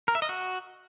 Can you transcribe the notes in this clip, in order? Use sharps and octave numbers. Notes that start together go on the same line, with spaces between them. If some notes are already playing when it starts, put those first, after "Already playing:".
A#4
E5
D#5
F#4